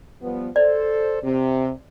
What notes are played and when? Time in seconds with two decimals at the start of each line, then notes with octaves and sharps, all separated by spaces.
0.22 F3 G3 B3
0.56 A4 C5 D5
1.23 C3